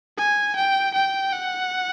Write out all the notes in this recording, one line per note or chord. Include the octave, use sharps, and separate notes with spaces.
G#5
G5
G5
F#5